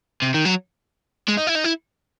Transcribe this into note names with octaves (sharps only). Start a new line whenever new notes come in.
C3
D#3
F#3
G#3
D#4
E4
D#4
E4